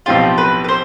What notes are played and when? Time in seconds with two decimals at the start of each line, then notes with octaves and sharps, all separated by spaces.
0.06 B1 A2 F3 C4 F4 G4
0.38 B4
0.64 B4
0.69 C5